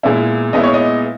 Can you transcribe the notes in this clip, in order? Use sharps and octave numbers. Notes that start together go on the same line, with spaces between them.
A#2 G#3 B3 E4
A#2 G#3 B3 E4 D#5
C#5
D#5